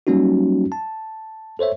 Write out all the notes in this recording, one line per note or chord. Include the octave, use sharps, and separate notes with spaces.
F#3 G3 A#3 C#4 D#4 F#4
A5
A4 C5 C#5 E5